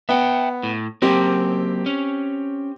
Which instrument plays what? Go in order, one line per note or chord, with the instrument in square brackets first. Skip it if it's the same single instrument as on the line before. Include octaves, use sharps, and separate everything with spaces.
[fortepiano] B3 [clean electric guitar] E5 G5
[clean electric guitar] A2
[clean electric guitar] F#3 A#3 A#4 [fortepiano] C4 G4
[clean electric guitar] C#4